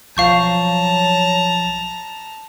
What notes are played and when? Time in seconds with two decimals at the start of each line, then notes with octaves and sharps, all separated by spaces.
0.17 B1 F3 F#3 F5 A5 A#5 C#6 G6